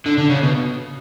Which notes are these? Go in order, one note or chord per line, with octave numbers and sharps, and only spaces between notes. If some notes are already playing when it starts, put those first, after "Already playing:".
D3
D3
C#3
B2